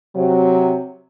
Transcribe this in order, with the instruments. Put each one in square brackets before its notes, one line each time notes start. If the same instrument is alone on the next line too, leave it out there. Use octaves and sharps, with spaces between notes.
[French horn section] C3 F#3